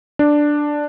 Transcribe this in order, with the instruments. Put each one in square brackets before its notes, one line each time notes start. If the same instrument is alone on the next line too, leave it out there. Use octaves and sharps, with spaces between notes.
[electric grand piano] D4